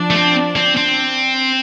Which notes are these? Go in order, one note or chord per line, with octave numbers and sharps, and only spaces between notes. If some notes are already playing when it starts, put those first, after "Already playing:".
Already playing: F3 D4
A3
C4
C4
C4